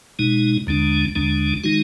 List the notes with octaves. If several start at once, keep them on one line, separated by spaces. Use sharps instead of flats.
B2 G#3 D#4
D#2 D3 G#3 D4
D#2 D3 G#3 D4
D#3 G#3 D#4 F#4